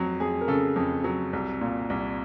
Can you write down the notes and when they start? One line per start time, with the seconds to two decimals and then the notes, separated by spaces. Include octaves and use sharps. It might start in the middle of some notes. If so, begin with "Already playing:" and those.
Already playing: F2 F#3
0.20 F2 G#4
0.41 A#4
0.48 C#3 A4
0.76 F2
1.04 F#3
1.33 C2
1.61 A#2
1.90 C2